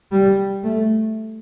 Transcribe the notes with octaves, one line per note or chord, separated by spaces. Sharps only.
G3
A3